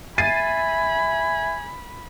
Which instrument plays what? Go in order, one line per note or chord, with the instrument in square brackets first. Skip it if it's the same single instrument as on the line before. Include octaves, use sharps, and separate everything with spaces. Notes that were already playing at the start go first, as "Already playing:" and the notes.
[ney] E5 [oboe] G#5 [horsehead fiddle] B5 [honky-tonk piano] A6 C7 D#7